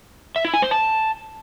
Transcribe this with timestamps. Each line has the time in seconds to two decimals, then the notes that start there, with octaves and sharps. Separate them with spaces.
0.36 E5
0.45 E4
0.53 G#5
0.62 C5
0.71 A5